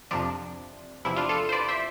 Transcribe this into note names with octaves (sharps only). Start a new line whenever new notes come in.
F2 C3 F3 D4
E2 C3 F3 E4
D4 F4
F4 A4
C5
B4 D5
C5 E5